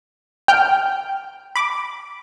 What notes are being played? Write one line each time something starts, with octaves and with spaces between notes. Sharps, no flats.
G5 F6 G6
B5 D6